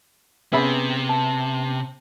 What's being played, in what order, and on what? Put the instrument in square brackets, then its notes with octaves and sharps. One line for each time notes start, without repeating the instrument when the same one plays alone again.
[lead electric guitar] C3 [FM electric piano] B3 C#4 [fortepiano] G#4 E5 B5
[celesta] A5